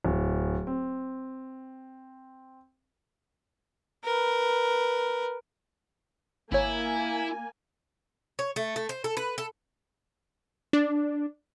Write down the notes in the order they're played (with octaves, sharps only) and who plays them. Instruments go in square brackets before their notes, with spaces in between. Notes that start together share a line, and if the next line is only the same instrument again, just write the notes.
[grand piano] D1
C4
[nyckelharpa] A#4 B4
[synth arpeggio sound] G#1 C#5 [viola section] A#3 G#5 [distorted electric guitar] E4
[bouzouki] C#5
A3
A3
C5
A4
B4
A4
[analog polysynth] D4